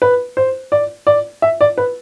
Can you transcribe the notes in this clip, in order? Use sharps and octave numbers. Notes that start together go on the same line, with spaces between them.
B4
C5
D5
D5
E5
D5
B4